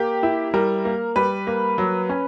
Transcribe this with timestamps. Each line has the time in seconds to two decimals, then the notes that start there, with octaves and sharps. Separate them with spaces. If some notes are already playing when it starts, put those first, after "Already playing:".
Already playing: A#3 G4
0.23 E4
0.54 G3 A#4
0.85 A#3
1.16 G3 B4
1.47 A#3
1.78 F#3
2.09 C#4